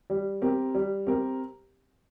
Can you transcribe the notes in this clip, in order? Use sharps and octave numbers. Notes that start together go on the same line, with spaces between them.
G3
C4 G4 A#4
G3
C4 G4 A#4